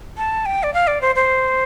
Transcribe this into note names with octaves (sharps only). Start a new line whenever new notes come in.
A5
G5
D5
F5
D5
C5
C5